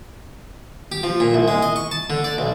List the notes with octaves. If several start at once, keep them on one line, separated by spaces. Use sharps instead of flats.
G4
F3
A#2
C2
G#3
D#5
C#6
A5
D3
D5
B1